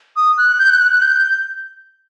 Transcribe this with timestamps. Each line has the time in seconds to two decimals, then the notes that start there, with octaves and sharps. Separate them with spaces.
0.17 D#6
0.38 F#6
0.59 G6
0.70 F#6
0.80 F#6
0.91 F#6
1.02 G6